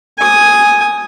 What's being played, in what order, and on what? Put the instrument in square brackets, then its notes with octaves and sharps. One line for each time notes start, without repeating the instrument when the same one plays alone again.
[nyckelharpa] G#5 D#6